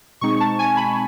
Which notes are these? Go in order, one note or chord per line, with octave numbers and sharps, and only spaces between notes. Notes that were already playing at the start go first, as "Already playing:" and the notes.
B2 G#3 C4 D#4 C#6
A5
G#5
B5